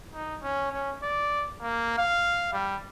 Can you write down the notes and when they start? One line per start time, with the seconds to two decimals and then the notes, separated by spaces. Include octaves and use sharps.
0.14 D#4
0.43 C#4
0.72 C#4
1.03 D5
1.62 A#3
1.98 F5
2.53 G3